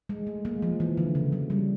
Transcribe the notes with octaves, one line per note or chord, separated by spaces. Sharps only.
G#3
A3
G#3 A#3
F3
E3
D3
C#3
F#3
G3